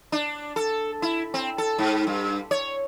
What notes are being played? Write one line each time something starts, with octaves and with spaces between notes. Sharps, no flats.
D4
A4
E4
C4
A4
G#2
G2
C#5